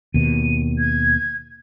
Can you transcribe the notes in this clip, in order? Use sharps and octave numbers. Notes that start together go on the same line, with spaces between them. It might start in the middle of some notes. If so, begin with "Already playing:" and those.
D#2 B2 D#7
G#6